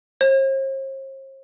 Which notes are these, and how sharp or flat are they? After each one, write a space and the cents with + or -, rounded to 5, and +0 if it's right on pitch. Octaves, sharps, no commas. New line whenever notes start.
C5 +45